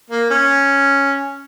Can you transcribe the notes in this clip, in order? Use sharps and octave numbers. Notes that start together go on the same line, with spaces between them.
A#3
C#4